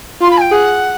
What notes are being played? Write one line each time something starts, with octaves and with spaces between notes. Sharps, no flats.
F4 C6
B5
G#5
G5
G#4 F#5